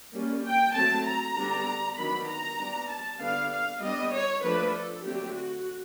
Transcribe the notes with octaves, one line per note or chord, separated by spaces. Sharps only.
G3 A#3 C#4
G5
F#3 A3 C4 A5
A#5
D3 G3 B3 D4
D#3 F#3 B3 D4 B5
A#5
G3 B3 D4
A5
D3 G3 B3 D4 F5
F5
G3 B3 D4 D#5
C#5
F3 A3 D4 B4
A4
D3 F#3 A3 C4 G4
F#4